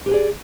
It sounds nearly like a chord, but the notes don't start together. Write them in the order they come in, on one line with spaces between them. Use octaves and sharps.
G4 B4 G#4 D5